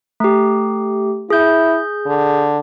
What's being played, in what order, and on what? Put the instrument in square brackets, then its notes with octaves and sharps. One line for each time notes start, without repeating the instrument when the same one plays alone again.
[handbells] A3 G4
[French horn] E4 [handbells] G#4 G6
[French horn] D3